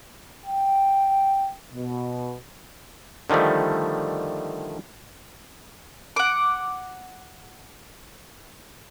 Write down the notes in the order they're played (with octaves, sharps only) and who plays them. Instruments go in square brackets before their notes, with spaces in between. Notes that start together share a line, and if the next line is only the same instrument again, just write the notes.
[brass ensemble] G5
B2
[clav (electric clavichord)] D3 D#3 F3 G3 A3
[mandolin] F#5 D6